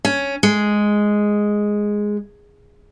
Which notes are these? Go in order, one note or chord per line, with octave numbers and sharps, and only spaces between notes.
C#4
G#3